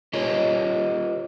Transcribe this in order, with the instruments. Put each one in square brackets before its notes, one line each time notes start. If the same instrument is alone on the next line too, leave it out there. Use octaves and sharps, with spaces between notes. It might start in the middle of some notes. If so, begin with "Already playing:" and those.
[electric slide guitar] F4 G4 A#4 C#5 D#5